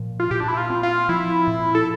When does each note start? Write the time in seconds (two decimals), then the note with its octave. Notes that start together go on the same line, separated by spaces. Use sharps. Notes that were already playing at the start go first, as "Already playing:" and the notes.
Already playing: A#2 F3
0.20 F4
0.31 A#2 G4
0.40 D4
0.48 E4
0.57 F4
0.70 C4
0.83 F4
1.09 F3 E4
1.47 A#2
1.75 A4